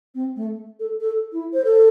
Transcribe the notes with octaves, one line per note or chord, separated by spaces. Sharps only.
C4
A3
A4
A4
E4
C5
A4